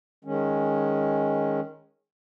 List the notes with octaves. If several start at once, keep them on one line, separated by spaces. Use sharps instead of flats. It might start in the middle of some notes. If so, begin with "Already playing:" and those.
D#3 G#3 C#4